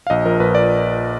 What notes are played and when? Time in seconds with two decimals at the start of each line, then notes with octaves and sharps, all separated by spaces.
0.07 F5
0.10 A#1 D#5
0.25 F3 A#4
0.40 A#1 B4
0.55 D5